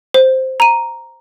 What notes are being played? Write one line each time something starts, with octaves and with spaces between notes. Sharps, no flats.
C5
A#5 D#7